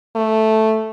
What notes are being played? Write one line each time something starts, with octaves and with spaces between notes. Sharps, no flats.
A3